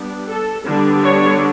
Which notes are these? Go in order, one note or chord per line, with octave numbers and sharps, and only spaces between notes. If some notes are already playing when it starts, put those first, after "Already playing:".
Already playing: G3 B3 D4
A4
D3 G3 B3 D4
C#5